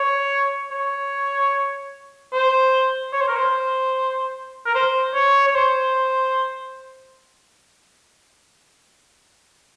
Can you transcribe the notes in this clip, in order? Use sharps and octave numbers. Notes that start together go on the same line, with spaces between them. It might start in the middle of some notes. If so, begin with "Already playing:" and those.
Already playing: C#5
C#5
C5
C#5
C5
A#4
C5
A#4
C5
C#5
C#5
C5